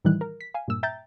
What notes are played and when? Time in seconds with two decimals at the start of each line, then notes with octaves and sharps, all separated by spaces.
0.05 A2 D#3 E3 G3 E4 F#6
0.21 A#4
0.41 B6
0.54 F5 G#5
0.68 G2 A#2 E6
0.83 E5 G5 A#5 G6 A6